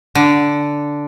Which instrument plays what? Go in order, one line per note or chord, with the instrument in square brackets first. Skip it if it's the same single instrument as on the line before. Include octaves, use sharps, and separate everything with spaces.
[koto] D3